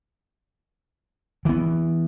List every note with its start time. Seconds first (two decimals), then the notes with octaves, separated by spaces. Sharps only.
1.45 E3 B3